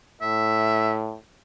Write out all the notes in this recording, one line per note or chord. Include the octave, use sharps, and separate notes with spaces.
A2 E5